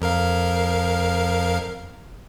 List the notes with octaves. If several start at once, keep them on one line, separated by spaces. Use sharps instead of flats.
F2 A#4 F5